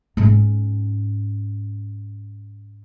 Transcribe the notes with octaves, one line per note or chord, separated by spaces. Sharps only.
G#2 C#4